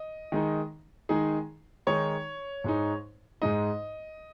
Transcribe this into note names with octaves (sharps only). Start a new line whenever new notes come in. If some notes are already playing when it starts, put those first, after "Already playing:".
Already playing: D#5
D#3 G#3 D#4
D#3 G#3 D#4 G#4
D#3 G#3 D#4 C#5
G#2 G#3 D#4
G#2 G#3 D#4 D#5